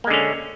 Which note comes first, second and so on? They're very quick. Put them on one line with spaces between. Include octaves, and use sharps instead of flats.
A#3 G#3 D3 C#4